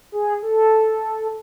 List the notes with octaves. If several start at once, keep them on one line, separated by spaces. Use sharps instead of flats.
G#4
A4